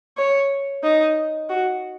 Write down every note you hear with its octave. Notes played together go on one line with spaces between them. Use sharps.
C#5
D#4
F#4